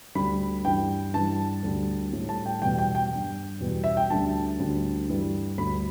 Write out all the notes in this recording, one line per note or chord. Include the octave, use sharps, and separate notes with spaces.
D2 D3 G3 B5
G2 E3 G3 G5
G2 E3 G3 A5
D2 D3 G3
A2 G3
A5
G5
E2 B2 G3 G5
G5
G5
G2 G3
E2 B2 G3
E5
G5
D2 D3 G3 A5
D2 D3 G3
G2 E3 G3
D2 D3 G3 B5